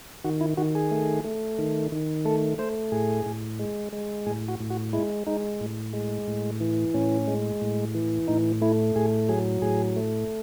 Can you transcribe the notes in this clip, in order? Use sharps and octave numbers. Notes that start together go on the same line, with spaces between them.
D#3 F#4
E4
D#3 F#4
G#4
A3
A3
D#3
D#3
A3 A4
A3 C5
A2 G#4
A2
G#3
G#3
A2 G#4
F#4
A2
F#4
G#3 E4
G#3 D#4
A2
G#3
A2
E3
A2 C#4
G#3
A2
E3
A2 D#4
A3 E4
A2 G#4
F#3 G#4
A2 G#4
A3